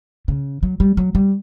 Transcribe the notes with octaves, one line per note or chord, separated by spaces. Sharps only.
C#3
F#3
G3
F#3
G3